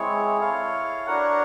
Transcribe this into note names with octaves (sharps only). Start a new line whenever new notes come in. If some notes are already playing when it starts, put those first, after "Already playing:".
Already playing: G#3 C4 E4 G#4 C#5
E4 A4 C#5 F5
D4 F#4 A#4 C#5 F#5